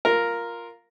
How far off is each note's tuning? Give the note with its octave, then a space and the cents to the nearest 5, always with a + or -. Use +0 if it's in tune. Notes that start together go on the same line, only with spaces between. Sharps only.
F4 +0 A#4 +0